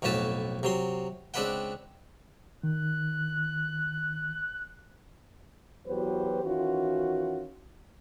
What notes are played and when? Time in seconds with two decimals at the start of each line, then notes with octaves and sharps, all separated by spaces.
0.02 B1 F2 A2 F#4 B4 A5
0.63 C3 F#3 C6
1.34 C#2 C4 D4 B4 F#5 G5
2.63 D#3 F#6
5.87 E2 F#3 F#4 G4 B4 C5
6.44 D#3 E3 C#4 F4 F#4